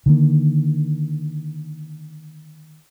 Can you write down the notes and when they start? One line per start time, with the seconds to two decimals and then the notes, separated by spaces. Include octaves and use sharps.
0.06 D3 D#3 A#3